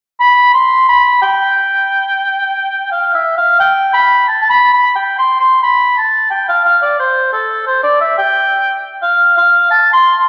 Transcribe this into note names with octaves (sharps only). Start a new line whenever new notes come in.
B5
C6
B5
G5
F5
E5
F5
G5
B5
A5
A5
B5
B5
G5
C6
C6
B5
A5
G5
F5
F5
D5
C5
A4
C5
D5
E5
G5
F5
F5
A5
C6